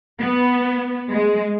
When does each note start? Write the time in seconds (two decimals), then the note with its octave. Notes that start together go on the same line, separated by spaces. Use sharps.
0.19 B3
1.09 G#3